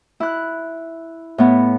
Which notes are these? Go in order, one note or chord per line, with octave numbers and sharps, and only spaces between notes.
E4 F#6
A2 B3